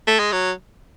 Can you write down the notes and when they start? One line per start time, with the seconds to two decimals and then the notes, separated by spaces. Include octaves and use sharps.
0.07 A3
0.19 G#3
0.32 F#3